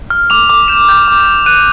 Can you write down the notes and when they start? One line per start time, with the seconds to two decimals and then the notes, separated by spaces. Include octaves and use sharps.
0.10 F6
0.30 D6 F7
0.49 D6
0.68 G6 E7
0.89 G6
1.08 D6
1.27 D6
1.46 F#6 D#7